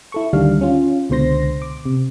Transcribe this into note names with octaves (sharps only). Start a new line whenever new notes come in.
E4 A4 C#6
D2 D#3 G3 D4 F5
C#4 F4
C#2 B2 D3 C5 C6 A#6
D6
C3